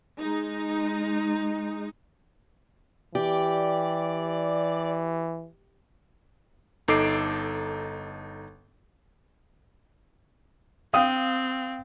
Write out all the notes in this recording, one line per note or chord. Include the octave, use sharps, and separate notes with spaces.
G#3 D#4
E3 G4 D5
G1 D#4 A4 D6 C7 D7
C4 F5 G5 D#6